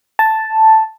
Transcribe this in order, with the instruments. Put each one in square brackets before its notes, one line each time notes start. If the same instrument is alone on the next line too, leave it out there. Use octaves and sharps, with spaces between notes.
[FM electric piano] A5